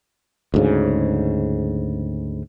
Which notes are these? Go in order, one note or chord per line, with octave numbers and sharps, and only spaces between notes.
D2 G#2 C#3